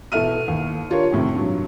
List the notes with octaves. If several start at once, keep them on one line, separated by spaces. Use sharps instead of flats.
B2 E3 A4 E5 F6 D#7
D#2
D4 F4 G4 A#4 C#5
F2 A2 C3 D#3
G2 F#3